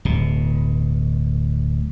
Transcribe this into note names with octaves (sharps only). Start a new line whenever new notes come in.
D1 B2